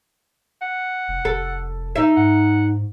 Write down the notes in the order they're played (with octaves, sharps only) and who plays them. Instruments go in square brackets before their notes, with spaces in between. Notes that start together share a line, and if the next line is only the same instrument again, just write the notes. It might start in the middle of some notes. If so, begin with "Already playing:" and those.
[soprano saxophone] F#5
[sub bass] F1
[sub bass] F1 [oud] A4
[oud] D#4 E5
[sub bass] G#2 [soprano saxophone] F#5